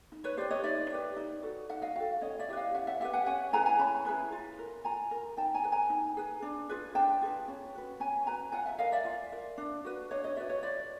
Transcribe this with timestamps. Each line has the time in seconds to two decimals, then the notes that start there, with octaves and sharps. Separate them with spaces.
0.12 D#4
0.24 B4 C#5
0.37 G4 B4 C5 D5
0.51 C#5 D#5
0.64 D#4 D5 E5
0.90 G4 B4
1.16 D#4
1.43 F#4 A4
1.69 D#4 E5 F#5
1.82 D#5 F5
1.96 F#4 A4 F5 G5
2.21 C#4 C#5 D#5
2.39 D5 E5
2.48 E4 G4 B4
2.56 D#5 F5
2.74 C#4 E5 F#5
2.87 E5 F#5
3.00 E4 G4 B4 E5 F#5
3.13 F#5 G#5
3.26 C#4 F#5 G#5
3.53 E4 G#4 B4 G#5 A#5
3.66 G#5 A#5
3.79 C#4 A5 B5
4.06 E4 G#4 B4
4.32 F4
4.59 A#4
4.84 F4 G#5 A#5
5.11 A#4
5.37 D#4 G5 A5
5.54 G#5 A#5
5.63 G#4 B4
5.72 G#5 A#5
5.90 D#4
6.17 G#4 B4
6.42 D4
6.69 F4 G#4 B4
6.95 D4 G5 A5
7.21 F4 G#4 B4
7.48 C#4
7.75 F#4 B4
8.00 C#4 G#5 A#5
8.26 F#4 B4 G#5 A#5
8.52 F4 F#5 G#5
8.66 E5 F#5
8.79 A#4 D#5 F5
8.92 D5 E5
9.05 F4
9.32 A#4
9.58 D4
9.85 F#4 B4
10.11 D4 C#5 D#5
10.24 C#5 D#5
10.37 F#4 B4 D5 E5
10.49 C#5 D#5
10.63 F4 D5 E5